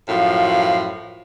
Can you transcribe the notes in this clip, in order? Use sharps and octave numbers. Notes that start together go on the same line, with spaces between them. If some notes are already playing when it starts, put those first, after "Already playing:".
F#2 A2 F3 F5